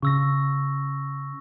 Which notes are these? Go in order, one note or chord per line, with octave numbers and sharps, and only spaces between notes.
C#3 C#6 E6 A#6